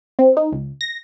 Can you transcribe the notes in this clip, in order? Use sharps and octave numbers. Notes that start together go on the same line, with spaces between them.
C4
D#4
C#2
A#6